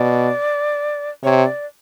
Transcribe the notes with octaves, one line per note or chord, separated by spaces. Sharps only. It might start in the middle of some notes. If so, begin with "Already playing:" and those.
Already playing: B2 D5
C3 C#5
D5